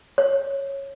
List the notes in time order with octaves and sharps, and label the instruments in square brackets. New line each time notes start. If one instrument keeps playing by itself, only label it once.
[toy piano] C#5